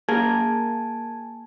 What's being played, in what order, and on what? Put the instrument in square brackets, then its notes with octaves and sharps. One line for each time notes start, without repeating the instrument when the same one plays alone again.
[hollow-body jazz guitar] A#3 G#4 A#4 [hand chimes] G#5 A5 G#6